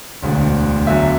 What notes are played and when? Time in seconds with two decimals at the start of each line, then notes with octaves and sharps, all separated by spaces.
0.23 E1 D2 D3
0.86 E2 D3 F#3 E5